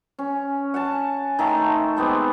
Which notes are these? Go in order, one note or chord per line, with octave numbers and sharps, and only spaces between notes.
C#4
F#5 G#5 A5
D#3 A3 A4 C6
G#3 B3 C4 G4